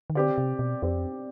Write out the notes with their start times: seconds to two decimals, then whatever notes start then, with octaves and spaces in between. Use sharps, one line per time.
0.10 D#3
0.15 D3 C4 G4 D5
0.38 C3
0.59 B2
0.82 F2 C4 G4 D5